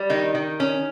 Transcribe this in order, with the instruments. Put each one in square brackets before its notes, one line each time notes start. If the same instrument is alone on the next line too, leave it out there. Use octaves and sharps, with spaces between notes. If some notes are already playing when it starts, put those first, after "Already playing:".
Already playing: [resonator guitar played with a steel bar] G3
D#3 D#4
D#3
C#4